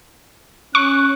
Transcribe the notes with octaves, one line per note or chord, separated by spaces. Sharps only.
C#4 C#6 F#6